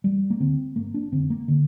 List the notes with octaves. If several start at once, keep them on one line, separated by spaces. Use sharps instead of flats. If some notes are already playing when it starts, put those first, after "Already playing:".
E1 G3
A#3
D2 D3 C4
G1 A#3
D4
F2 D3 C4
A#3
D3